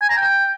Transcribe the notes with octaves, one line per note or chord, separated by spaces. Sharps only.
G#5
A#5
G5